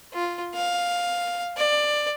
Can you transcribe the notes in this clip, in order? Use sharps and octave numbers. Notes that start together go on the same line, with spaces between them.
F4
F5
D5